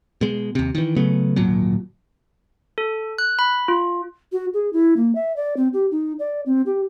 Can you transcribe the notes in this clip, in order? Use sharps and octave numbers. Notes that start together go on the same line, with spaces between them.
B2 G#3
D#2 C3
D#3 E3
C#3 F#3 A3 B3
D1 G#1 A#2 F#3
A4
F#6
B5
F4
F#4
G#4
E4
A#3
E5
D5
C4
G4
D#4
D5
C4
G4